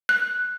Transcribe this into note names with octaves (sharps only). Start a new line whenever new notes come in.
F#6